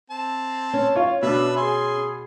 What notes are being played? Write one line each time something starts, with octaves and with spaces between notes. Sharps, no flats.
C4 A5
C#4
F4 C#5
B2 D4 B4 E5
G#4 G#5 C6